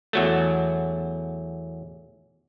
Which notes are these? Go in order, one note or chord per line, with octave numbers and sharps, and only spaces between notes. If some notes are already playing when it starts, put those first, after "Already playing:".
E2 F#3 A3